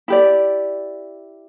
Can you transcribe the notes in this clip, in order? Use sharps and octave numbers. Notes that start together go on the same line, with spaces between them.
E4 G4 D5